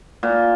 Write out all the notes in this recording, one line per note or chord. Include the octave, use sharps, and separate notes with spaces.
A#2